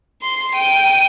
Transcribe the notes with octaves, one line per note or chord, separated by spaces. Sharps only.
C6
G5 D#7